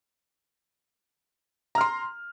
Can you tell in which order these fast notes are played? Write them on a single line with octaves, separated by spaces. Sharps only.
A#5 F6 C6